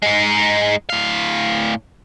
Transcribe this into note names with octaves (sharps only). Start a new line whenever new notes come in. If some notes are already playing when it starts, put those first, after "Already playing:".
G#3 D#4
A2 F5